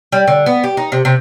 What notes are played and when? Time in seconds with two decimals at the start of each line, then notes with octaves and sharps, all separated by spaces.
0.12 G3
0.27 D3
0.46 B3
0.64 G4
0.77 D#4
0.92 C3
1.05 C3